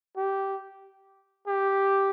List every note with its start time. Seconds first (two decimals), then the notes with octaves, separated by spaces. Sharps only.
0.17 G4
1.48 G4